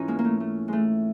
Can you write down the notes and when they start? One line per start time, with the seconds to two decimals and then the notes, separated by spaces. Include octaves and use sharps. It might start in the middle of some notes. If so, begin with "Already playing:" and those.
Already playing: G#2 E3 C#4 D#4 F4
0.08 G#3 A#3
0.19 A#3
0.25 A3
0.40 A3
0.68 G#3 A3